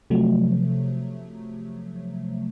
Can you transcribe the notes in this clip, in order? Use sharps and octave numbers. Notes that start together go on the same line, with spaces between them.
C3 F3 F#3 A3